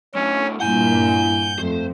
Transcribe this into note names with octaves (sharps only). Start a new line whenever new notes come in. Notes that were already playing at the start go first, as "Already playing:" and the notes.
A2 F#3 C#4
G2 A#2 E4 F#5 G#5 G6
F2 A3 C5